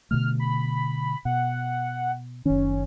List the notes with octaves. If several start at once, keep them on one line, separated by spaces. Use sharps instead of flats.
B2 D3 A3 F6
B5
B2 F#5
F#1 D#3 C#4